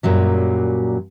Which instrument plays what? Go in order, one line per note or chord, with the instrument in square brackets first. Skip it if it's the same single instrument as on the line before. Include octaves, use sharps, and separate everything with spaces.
[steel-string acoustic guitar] F#2 A#2 F#3 G3